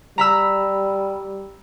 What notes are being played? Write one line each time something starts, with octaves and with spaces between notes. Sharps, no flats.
G3 A#5 B5 E6